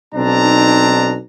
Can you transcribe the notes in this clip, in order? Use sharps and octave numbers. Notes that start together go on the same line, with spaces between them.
B1 C4 D4 D#4 A5 A#5